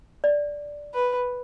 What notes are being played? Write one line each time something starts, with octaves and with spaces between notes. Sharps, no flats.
D5
B4